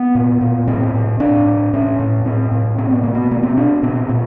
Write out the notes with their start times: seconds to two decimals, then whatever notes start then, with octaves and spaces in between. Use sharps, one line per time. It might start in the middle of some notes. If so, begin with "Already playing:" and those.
Already playing: B3
0.15 A#2
0.41 A#2
0.68 A2 C4
0.94 A2
1.20 A2 D4
1.46 A2
1.73 A2 C#4
1.99 A2
2.25 A2 C4
2.52 A2
2.78 B2 C4
2.90 B3
3.03 B2 A#3
3.15 B3
3.31 B2 A#3
3.43 C4
3.57 B2 D4
3.83 A#2 C4
4.09 A#2